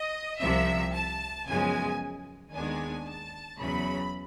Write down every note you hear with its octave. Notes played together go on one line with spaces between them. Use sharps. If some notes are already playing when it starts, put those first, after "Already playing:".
Already playing: D#5
C2 C3 F3 E5
A5
F#2 C#3 F3 G#3 B3 G#5
D#2 D#3 G#3 B3 D4 G#5
A5
E2 C#3 F#3 B5